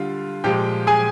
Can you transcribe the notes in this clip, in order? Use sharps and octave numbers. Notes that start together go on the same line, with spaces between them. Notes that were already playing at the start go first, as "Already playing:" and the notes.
Already playing: D3 G3 F4 F5
A#2 F3 G#3 G4 G5
G#4 G#5